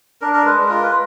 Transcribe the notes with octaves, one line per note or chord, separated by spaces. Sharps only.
D4 A#4
A#4
G#3 B4
F4 A#4
B4